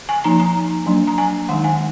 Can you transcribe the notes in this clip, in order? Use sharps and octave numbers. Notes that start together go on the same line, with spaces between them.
G#5
F3 A#3 D#4 A#5
A#5
F#3 A#3 D4
A#5
G#5
D#3 G#3 D#4 F#5
G#5